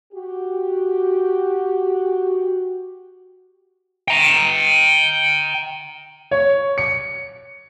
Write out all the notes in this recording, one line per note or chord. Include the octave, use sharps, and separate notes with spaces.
F#4 G4
G5 A#5
C#5
C#7